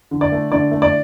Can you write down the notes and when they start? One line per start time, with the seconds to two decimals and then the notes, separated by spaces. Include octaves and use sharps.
0.11 D3
0.21 D5
0.32 A3
0.52 D3 D5
0.71 A3
0.82 D5